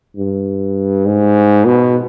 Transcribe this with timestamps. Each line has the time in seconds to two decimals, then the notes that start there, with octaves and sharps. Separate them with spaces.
0.16 G2
1.06 G#2
1.66 B2